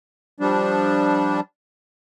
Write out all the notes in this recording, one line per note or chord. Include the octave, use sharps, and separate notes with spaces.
F3 G3 D4